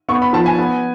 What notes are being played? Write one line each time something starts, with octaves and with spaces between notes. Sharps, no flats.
B3 C#6
B5
F3 A5
G#5
B3